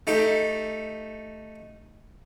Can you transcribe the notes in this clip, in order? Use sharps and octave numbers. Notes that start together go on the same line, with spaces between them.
A3 D#4 G4 A4